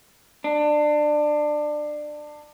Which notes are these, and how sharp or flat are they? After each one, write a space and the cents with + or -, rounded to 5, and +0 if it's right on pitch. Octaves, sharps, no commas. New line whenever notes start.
D4 +25